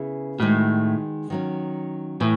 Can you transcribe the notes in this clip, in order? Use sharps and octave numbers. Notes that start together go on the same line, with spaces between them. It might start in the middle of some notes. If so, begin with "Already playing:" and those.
Already playing: C#3 B3 E4 G#4
A2 D#3 G#3 D#4 F#4
D#3 F#3 C#4
A2 E3